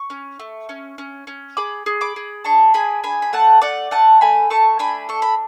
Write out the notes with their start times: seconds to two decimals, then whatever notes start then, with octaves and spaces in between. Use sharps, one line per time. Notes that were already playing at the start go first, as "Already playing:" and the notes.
Already playing: C#6
0.10 C#4
0.39 A3
0.69 C#4
0.98 C#4
1.27 C#4
1.57 G#4 B5 D6
1.86 G#4
2.01 B5 D6
2.16 G#4
2.44 D4 A5 C#6
2.74 G#4 G#5 B5
3.03 D4 G#5 B5
3.22 B5
3.33 A3 F#5 A5
3.62 A3 D5 F#5
3.91 A3 F#5 A5
4.21 A3 G#5 B5
4.50 A3 A5 C#6
4.79 D4 G#5 B5
5.09 A4 C#6
5.22 B5